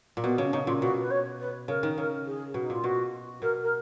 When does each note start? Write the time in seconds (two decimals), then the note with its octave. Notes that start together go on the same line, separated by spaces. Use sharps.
0.17 A#2
0.24 B2 B3
0.38 C#3
0.45 C#4
0.53 C#3 D#4
0.67 A#2 F4
0.81 B2 F#4
1.00 B4
1.10 C#5
1.39 B4
1.68 C#3 A#4
1.83 D#3
1.97 C#3 A#4
2.26 G#4
2.54 B2
2.61 D#4
2.70 A#2 F4
2.84 B2 F#4
3.42 B2 A#4
3.63 A#4